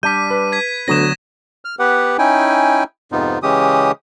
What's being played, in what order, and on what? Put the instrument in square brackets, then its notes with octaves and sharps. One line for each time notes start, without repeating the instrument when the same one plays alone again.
[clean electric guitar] G3 D4 [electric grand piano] G6 [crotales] B6 D#7
[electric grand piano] B4
[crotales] G#6 B6
[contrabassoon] D2 [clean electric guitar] D3 F#3 B3 [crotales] A#6 E7
[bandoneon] F6
B3 G4 B4 F#5
C#4 D#4 E4 G5 G#5
F2 G#2 C3 B3 D#4 F4
C#3 E3 G#3 C#4 G4 D#6